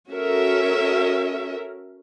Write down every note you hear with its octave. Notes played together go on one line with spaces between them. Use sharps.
C#4 F#4 A4 A#4 E5